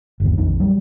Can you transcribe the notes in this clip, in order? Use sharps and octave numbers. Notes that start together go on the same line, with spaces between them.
G1 D#2
A#1 F2 D#3
F#3 G3